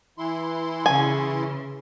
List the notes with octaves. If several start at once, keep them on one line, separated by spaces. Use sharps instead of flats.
E3 E4 C6
C#3 G#5